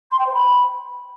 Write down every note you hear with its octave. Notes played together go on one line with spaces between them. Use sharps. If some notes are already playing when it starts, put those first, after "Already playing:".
C6
G5
C5
B5